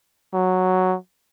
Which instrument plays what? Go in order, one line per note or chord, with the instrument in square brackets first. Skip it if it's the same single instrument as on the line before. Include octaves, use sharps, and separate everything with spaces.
[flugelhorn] F#3